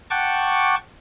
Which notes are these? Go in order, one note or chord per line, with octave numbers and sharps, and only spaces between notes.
F#5 G5 A5 C#6 D6 F#6